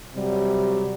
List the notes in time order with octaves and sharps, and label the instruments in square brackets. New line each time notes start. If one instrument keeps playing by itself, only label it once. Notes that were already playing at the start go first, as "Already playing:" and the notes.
[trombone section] C3 F#3 G3